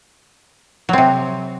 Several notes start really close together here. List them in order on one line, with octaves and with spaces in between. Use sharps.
F#3 C4 C3